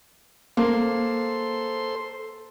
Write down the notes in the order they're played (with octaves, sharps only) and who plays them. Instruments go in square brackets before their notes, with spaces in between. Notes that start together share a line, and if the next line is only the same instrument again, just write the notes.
[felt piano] A#3 [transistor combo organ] A4 C5 C6